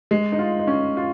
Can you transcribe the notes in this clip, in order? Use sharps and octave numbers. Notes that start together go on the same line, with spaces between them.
G#3
D#4
F4
D#4
C#4
F4